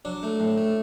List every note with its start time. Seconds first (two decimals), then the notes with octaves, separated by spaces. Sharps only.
0.05 F#3 D4
0.23 A3
0.40 A2
0.57 A3